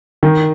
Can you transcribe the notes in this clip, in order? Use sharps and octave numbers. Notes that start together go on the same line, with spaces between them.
D#3